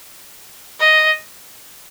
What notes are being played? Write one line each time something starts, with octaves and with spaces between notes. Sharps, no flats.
D#5